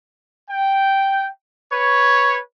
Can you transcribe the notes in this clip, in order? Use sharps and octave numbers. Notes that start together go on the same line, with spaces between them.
G5
B4 C#5